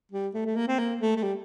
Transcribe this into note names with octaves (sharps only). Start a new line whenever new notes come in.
G3
A3
A3
A#3
C4
A#3
A3
A3
G3